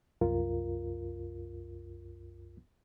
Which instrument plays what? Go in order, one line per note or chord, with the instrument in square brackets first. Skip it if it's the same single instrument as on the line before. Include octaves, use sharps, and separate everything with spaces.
[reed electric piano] C2 F#2 F4 A#4